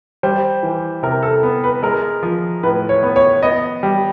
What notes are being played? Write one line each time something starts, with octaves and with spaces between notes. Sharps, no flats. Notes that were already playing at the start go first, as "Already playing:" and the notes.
G3 C5
E3
C3 A#4
A4
B3
B4
G#3 A#4
F3
A2 B4
C#5
B3
C#5
B3 D#5
G3